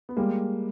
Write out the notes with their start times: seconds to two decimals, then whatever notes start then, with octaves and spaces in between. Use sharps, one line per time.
0.09 B3
0.17 G3 G#3 A#3